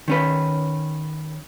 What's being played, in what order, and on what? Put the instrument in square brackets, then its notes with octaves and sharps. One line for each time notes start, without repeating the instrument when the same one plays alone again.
[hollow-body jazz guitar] D#3 C#4 B4